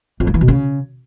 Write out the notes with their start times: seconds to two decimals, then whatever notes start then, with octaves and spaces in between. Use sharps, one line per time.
0.20 F2
0.27 G2
0.34 E3
0.41 B2
0.48 C#3